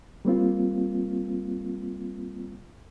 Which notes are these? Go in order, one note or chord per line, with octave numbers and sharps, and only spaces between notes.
G3 A#3 C4 F4